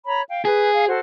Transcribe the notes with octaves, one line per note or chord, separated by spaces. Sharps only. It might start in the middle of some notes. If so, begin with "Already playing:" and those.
C#5 A#5 B5
F5 G5
G#4 B4
F5
F#4 A4 C5